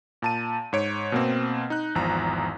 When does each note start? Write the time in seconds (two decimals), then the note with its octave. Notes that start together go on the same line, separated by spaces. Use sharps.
0.22 A#2 A5 D#7
0.73 G#2 C#5 D7
1.12 B2 A#3 C4
1.70 D#4 F#6
1.95 G#1 E2 F3 A#5